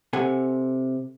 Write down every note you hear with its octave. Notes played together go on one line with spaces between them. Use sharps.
C3 A4 F#5 G#5